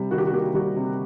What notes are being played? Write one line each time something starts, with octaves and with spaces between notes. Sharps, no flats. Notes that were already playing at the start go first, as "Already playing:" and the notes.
Already playing: C3 G3
D#3 F#4
G4
F#4
A#3 G4
F#4
G3 F#4
C3